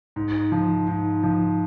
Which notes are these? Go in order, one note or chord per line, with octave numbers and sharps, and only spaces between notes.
G#2
F3
G#2
F3